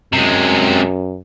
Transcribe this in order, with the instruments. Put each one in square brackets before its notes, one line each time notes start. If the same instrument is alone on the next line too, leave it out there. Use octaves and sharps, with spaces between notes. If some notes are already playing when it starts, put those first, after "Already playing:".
[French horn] F#2 [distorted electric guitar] C3 G#3